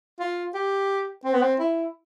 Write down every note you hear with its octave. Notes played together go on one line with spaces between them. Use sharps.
F4
G4
C4
B3
C4
E4